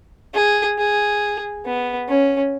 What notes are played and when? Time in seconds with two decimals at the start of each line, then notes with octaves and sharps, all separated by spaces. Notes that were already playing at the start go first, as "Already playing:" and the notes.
0.34 G#4
0.78 G#4
1.66 B3
2.08 C#4